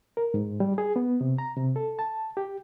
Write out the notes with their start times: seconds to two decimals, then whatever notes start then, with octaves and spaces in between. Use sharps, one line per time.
0.17 A#4
0.34 G#2
0.60 G3
0.78 G#4
0.96 B3
1.21 C3
1.38 A#5
1.57 C3
1.76 A4
1.99 A5
2.37 G4